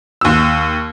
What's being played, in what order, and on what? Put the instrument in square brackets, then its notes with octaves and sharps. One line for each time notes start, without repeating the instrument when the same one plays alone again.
[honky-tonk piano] D#2 E6